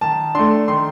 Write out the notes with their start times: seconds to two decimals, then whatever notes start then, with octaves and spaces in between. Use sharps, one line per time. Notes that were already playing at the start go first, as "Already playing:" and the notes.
0.01 D#3 A5
0.35 A3 D4 C6
0.68 D#3 C6